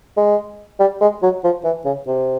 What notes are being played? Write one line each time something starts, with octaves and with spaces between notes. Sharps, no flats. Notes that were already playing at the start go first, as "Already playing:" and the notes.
G#3
G3
G#3
F#3
F3
E3
C#3
C3